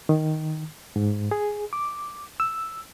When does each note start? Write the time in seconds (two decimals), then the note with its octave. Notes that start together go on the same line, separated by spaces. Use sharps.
0.09 D#3
0.96 G#2
1.31 G#4
1.73 D6
2.40 E6